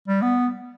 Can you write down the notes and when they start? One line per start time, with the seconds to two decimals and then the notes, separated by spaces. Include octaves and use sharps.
0.08 G3
0.22 B3